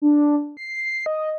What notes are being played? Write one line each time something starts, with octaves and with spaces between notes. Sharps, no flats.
D4
C7
D#5